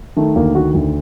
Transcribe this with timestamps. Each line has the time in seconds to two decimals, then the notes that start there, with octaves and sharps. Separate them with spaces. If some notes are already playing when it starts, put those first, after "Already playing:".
0.17 D#3 A3
0.36 D2 A#3
0.55 D#3 F#4
0.74 D2